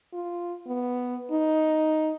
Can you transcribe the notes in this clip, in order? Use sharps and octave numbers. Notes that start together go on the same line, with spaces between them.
F4
B3
D#4